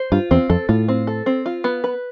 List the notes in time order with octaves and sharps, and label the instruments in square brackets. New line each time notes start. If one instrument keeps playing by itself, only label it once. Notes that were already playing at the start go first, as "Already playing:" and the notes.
Already playing: [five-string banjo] C5
[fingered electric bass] G2 [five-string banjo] F4
[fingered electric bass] E2 [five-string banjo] C4
[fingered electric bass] F2 [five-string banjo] A4
[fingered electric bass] A2 [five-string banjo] F4
[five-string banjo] C4
A4
C4
F4
B3
B4